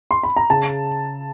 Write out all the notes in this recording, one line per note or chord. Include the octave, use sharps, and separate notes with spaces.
C6
B5
A#5
C#3 A5